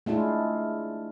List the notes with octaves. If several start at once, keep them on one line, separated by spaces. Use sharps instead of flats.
G#3 A3 D4 E4 F4